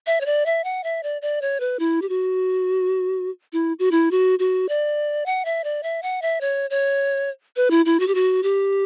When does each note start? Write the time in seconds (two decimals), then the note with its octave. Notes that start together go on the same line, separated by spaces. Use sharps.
0.07 E5
0.21 C#5
0.26 D5
0.46 E5
0.64 F#5
0.84 E5
1.03 D5
1.22 D5
1.42 C#5
1.60 B4
1.79 E4
2.02 G4
2.09 F#4
3.53 E4
3.79 F#4
3.91 E4
4.11 F#4
4.39 F#4
4.69 D5
5.26 F#5
5.45 E5
5.64 D5
5.83 E5
6.03 F#5
6.22 E5
6.41 C#5
6.70 C#5
7.56 B4
7.71 E4
7.86 E4
8.00 F#4
8.07 G4
8.15 F#4
8.43 G4